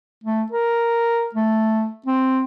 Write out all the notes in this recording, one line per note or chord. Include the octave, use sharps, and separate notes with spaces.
A3
A#4
A3
C4